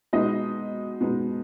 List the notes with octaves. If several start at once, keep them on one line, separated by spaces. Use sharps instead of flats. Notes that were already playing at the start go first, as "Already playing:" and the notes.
B2 G#3 B3 D#4 D#5
B2 G#3 B3 D#4